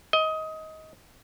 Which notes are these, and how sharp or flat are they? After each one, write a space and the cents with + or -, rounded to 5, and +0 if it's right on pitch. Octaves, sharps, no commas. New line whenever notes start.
D#5 +20